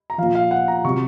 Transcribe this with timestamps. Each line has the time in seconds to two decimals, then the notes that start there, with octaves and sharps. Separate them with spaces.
0.10 A#5
0.18 A#2 F3 F5
0.35 F5
0.51 F#5
0.68 A#5
0.84 C3 F#3 C#6